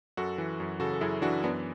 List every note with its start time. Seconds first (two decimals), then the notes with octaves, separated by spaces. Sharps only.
0.17 F#2 F#4 A4
0.38 E3
0.60 F#2
0.80 C#3 F#4 A4
0.93 A4
1.01 F#2 E4 G#4
1.22 E3 D4 F#4
1.43 F#2 B3 D4